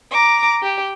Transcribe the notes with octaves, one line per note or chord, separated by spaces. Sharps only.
A#5 D6
G4